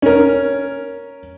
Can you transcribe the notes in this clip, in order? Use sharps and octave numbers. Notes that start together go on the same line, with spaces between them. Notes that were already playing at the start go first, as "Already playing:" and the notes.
C#4 A#4